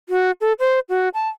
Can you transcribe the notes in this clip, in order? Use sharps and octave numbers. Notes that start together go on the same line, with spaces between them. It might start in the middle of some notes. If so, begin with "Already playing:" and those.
F#4
A4
C5
F#4
A5